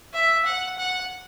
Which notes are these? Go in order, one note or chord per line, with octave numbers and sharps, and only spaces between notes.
E5
F#5
F#5